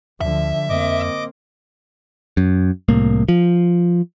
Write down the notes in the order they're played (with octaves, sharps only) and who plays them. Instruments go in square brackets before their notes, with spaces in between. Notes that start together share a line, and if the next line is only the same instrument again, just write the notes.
[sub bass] D2 [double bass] D3 F3 [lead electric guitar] E5
[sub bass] F2 [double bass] A#3 C4 [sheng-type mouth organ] D#5 D6
[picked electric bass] F#2
C2 A2 A#3
F3